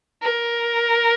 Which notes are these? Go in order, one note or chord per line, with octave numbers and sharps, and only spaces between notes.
A#4